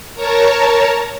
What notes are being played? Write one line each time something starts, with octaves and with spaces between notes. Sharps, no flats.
A#4 C#5 A5 A#5